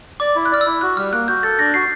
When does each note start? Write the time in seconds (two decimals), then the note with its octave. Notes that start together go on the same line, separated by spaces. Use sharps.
0.20 D5 D6
0.36 E4
0.46 F#6
0.52 D5 F6
0.61 E6
0.66 E4
0.81 F#4 F#6
0.97 G3 F6
1.13 A#3 F#6
1.28 F#4 G6
1.43 A4 A6
1.59 D4 A#6
1.74 F#4 C7